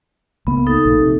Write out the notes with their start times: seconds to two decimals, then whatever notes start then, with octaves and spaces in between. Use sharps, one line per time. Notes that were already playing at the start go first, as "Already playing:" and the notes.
0.47 C#2 A#3 B3
0.67 D#4 A4
0.86 A#1 A#3
1.00 C3